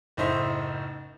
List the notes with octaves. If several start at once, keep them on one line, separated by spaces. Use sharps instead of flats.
F#1 A2 D#4 C5 E5